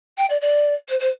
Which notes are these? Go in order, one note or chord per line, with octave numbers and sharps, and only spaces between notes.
G5
D5
D5
C5
C5